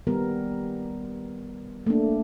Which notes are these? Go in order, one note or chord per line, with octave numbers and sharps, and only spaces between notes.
D#3 G3 B3 A#4
A3 A#3 D4